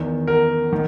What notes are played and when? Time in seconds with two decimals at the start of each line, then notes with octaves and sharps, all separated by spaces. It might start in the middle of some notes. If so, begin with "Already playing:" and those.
Already playing: E2 D#3
0.27 A#4
0.73 D#3